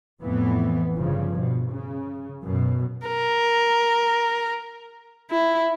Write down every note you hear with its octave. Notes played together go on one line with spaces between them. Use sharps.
F2 A2 E3 B3
G1 G2 C#3 F3
B2
C#3
F#2 B2
A#4
E4